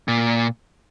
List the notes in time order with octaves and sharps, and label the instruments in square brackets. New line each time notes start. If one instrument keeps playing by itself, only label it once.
[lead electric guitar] A#2